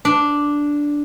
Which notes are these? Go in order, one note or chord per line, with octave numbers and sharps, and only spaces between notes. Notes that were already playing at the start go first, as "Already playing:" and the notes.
D4